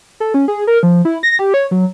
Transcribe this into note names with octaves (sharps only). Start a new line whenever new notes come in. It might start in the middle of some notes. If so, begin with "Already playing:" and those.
A4
C#4
G#4
A#4
F3
E4
A#6
G4
C#5
F#3